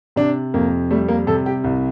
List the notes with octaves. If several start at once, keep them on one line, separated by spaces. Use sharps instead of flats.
C3 D4
F2 A#3
G3 A3
A#3
C3 A4
G4
C2